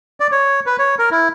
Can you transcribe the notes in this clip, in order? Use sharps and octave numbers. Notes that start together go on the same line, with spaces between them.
D5
C#5
B4
C#5
A#4
E4